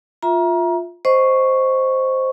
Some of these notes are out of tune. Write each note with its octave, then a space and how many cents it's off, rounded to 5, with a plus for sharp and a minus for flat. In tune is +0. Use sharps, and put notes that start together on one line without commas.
F4 +5 E5 +0 A#5 +30
C5 +0 D#5 +0 C#6 +0